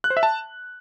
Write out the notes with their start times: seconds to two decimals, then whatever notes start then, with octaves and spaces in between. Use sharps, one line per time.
0.04 F#6
0.10 C5
0.17 E5
0.23 A5